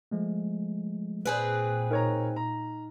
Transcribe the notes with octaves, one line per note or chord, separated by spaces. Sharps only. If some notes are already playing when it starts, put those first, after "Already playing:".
F3 G#3 A3
A#2 C4 G#4 B4
D#4 A#4 C#5 A#5
A#5